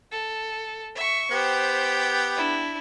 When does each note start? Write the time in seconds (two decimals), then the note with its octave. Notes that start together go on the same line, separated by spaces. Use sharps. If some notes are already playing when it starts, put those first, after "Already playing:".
0.12 A4
0.96 E5 C#6
1.32 B3 G4 C5 G5
2.35 D4 E4